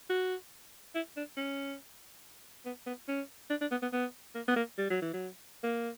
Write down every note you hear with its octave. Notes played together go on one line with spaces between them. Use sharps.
F#4
E4
D4
C#4
B3
B3
C#4
D4
D4
B3
B3
B3
A#3
B3
A#3
G3
F#3
E3
F#3
A#3